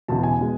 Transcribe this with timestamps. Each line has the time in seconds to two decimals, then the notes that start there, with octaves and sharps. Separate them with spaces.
0.08 E1 E2 C#3 E3 A5
0.23 G#5
0.40 B2 G#3